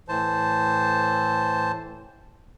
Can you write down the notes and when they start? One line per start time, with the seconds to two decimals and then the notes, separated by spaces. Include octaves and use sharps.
0.08 A2 E3 C5 A5